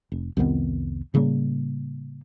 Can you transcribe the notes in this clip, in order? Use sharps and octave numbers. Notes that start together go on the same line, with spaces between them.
F1
C2 F2 D#3 B3
A2 C#3 G3 A#3